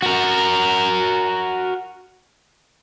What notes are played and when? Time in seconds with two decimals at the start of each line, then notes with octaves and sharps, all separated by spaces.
0.02 F#4 A#4